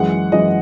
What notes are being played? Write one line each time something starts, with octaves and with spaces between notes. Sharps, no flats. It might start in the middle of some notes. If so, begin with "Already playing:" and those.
Already playing: F#2 E3 G#3 F#5
F#2 E3 G#3 D#5